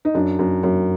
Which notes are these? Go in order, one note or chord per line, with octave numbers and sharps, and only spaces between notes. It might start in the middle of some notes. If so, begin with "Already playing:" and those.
D#4
F#2 D4
F#2
F#2